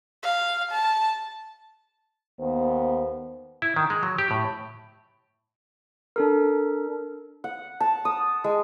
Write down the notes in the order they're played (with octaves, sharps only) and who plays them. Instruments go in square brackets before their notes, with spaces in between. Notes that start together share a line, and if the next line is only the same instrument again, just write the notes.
[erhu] F5
A5
[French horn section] D#2 B3 C5
[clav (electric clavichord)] E4
D#3
G#3
F#3
G4
A2
[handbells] D4 A4 A#4
[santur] F#5
A5
D#6
G#3